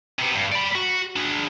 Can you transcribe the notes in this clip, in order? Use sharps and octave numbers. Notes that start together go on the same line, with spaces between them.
C3 B3
G2
D5 B5
F#4
D4 G#4